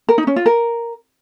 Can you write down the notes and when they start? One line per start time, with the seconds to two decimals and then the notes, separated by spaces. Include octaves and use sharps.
0.09 A#4
0.18 D#4
0.27 C#4
0.36 F4
0.46 A#4